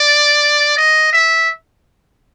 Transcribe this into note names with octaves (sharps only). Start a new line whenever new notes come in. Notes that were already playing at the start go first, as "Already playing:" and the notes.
Already playing: D5
D#5
E5